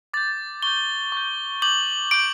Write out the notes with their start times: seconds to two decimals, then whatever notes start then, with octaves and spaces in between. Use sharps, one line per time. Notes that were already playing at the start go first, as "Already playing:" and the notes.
0.14 D6 G6 A6
0.62 C#6 G6 G7
1.12 C#6 G6
1.62 D6 G6 F#7
2.11 D6 G6 D7